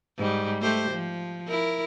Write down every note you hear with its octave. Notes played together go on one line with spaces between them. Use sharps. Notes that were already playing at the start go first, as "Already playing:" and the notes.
G#2 G3
A3 G4 C5
F3
E4 A#4